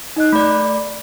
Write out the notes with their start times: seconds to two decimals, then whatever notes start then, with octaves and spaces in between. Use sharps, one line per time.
0.16 D#4 D#5 F#6
0.32 A3 D5 B5